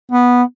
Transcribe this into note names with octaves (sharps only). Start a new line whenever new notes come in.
B3